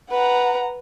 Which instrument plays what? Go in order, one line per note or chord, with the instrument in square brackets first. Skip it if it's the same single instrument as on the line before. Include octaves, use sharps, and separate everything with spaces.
[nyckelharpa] B4 [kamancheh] F#5 A#5